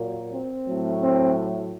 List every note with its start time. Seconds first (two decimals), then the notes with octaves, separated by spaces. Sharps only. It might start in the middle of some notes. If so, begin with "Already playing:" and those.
Already playing: A#2 F#3 A#3
0.32 C4
0.65 A2 F#3 A3
0.99 C4